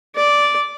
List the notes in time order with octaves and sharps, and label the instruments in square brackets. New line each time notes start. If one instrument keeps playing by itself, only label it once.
[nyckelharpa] D5